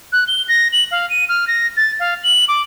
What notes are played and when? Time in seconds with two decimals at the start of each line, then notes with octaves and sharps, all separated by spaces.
0.12 F#6
0.28 G7
0.48 A#6
0.72 F#7
0.91 F5
1.10 D#7
1.29 F6
1.48 A#6
1.77 A6
2.00 F5
2.24 F#7
2.48 D6